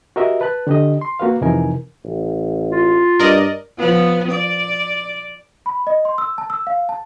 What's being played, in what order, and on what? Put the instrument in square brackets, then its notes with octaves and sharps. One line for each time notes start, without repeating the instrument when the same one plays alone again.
[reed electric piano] F#4 G4 A#4 D#5 E5
B4 A5 F#6
D3 G4 D#5
C6
A#3 F#4 B4 F5
F2 C3 E3 D#4 A#4 G#5
[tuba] A1
[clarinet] F4
[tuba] G2 [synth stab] A#4 D5 D#5
[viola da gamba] F3 B3
D5
[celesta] B5
D#5
C6
E6
A5
E6
F5
A5